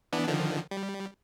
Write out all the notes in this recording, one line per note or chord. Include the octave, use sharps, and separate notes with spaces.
E3 B3 D4
D3 D#3 F3
G3